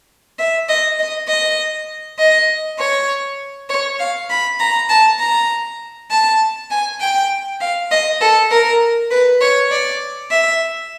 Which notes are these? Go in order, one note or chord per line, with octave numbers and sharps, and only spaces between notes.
E5
D#5
D#5
D#5
D#5
C#5
C#5
F5
B5
A#5
A5
A#5
A5
G#5
G5
F5
D#5
A4
A#4
B4
C#5
D5
E5